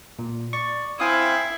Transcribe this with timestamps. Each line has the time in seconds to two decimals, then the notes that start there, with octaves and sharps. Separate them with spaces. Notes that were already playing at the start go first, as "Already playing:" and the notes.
0.19 A#2
0.53 D5 C#6
1.00 C4 E4 F5 G5 G#5 D#6